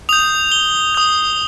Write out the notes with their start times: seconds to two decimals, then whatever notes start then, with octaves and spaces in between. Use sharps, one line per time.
0.09 D#6 G6 F7
0.52 G7
0.95 D#6 G6